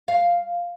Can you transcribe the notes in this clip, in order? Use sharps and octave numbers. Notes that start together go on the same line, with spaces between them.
F5